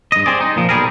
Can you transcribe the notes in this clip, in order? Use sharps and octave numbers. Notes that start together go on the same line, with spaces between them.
G2 D#5
C4 G#4 D5
D#4
A#2 F3
B1 G3 G#4 A#4